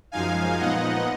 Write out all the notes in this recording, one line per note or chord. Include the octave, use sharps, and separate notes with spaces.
F#2 F3 G#3 D#4 F5 G#5
A#2 F3 B3 D#4 D#5 F#5